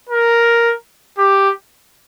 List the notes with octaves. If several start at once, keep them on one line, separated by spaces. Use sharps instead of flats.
A#4
G4